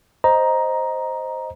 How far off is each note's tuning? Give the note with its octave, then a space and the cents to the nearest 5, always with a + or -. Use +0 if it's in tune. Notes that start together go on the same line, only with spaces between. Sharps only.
C5 +0 D#5 +0 A#5 +10